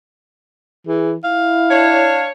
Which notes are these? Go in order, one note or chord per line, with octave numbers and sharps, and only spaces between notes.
E3 G#4
E4 F5
D4 C#5